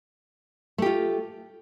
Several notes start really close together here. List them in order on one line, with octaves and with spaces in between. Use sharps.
A3 G4 F4